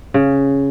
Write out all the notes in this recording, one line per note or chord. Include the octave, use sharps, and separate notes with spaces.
C#3